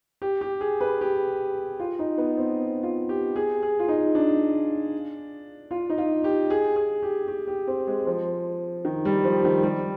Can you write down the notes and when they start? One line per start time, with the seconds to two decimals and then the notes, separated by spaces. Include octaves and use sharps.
0.22 G4
0.41 G4
0.61 G#4
0.81 B4
1.01 G4
1.80 F4
1.99 D#4
2.18 B3
2.37 C4
2.83 F4
3.09 G4
3.36 G#4
3.63 G#4
3.79 F4
3.88 D#4
4.15 D4
5.71 F4
5.90 D#4
5.98 F4
6.24 G4
6.50 G#4
6.76 G#4
7.03 G4
7.28 G4
7.47 G4
7.67 C4
7.87 G#3
8.07 F3
8.85 D#3
9.05 G3
9.24 F3
9.45 D#3
9.63 G3